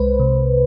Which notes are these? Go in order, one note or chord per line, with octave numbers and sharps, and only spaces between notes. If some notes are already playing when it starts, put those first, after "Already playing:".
Already playing: C2 G#3 B4 C5
C3